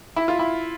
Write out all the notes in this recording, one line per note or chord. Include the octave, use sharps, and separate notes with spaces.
E4
F4
E4